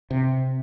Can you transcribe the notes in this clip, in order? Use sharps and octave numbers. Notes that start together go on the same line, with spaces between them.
C3